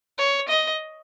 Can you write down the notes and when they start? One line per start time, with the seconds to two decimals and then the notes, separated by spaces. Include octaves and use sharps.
0.18 C#5
0.48 D#5